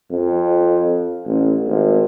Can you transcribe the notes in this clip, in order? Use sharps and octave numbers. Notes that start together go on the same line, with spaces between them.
F2
A1
G#1